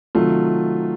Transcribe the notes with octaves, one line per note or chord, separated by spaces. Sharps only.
C3 D#3 F#3 A3 F4